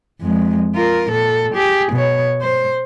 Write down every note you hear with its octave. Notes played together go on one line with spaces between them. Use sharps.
F2 G#3
F4 A#4
A#2 A4
G4 G#4
B2 C#5
C5